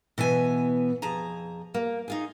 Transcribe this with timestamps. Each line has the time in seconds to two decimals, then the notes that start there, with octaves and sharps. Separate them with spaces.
0.18 B2 E3 B3 G#5
1.02 F2 G#4 A5 A#5
1.74 A#3
2.08 D#4 F4 G#4